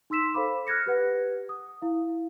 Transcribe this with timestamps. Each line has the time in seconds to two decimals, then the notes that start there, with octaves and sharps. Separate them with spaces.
0.10 D#4 C6 E6 B6 E7
0.34 A4 C5 F5 B5 D6
0.67 F6 F#6 G#6 A#6 C#7
0.86 G4 B4 F#5
1.49 D#6
1.82 E4 F5